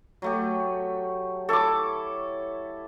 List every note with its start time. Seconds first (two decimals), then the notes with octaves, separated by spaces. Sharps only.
0.22 F#3 A3 G4
1.49 E4 A4 C#5 D6